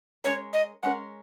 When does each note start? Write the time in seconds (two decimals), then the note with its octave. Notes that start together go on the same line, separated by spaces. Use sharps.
0.24 G#3 C#4 A#4 C#5
0.53 D#5
0.83 G#3 C#4 A#4 F#5